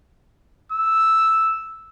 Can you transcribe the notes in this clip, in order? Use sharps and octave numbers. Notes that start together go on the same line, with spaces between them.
E6